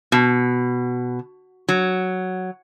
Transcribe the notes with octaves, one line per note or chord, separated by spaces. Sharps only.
B2
F#3